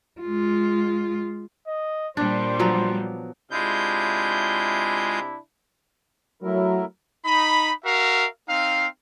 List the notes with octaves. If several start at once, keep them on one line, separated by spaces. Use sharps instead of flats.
G#3 F4
D#5
A#2 G3 D4 C5
F3 F#3 B3
C3 G#3 D4 E4 F4 G6
F#3 A3 E4 A#4
D#4 B5
F#4 A#4 E5 F5
C4 D#4 F5